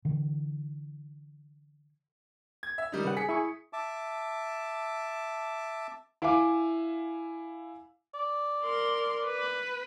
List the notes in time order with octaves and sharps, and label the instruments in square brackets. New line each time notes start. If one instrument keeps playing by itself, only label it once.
[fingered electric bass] D3 E3
[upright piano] G#6
E5
D#3 G3 D#4
[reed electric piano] C#3 B4 F#5
[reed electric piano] G#4 [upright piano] B6 C#7
[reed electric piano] E4 G#4 C#6 [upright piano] D#6
[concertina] E5 A5 D6
[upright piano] E4 E5 F5 G#5 D6
[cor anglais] D5
[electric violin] A#4 C6
B4